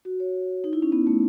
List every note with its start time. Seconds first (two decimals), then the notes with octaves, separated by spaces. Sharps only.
0.05 F#4
0.20 C#5
0.64 D#4
0.73 E4
0.82 C#4
0.92 B3
1.07 A3